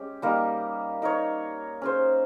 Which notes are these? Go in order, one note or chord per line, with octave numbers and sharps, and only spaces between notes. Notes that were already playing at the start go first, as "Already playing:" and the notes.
Already playing: G#3 C#4 G4
G3 A#3 D#4 A#4
D#4 A#4 C#5
C#4 G#4 C5